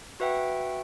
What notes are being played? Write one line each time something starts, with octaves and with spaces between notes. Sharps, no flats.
F#4 B4 E5 F#5 G5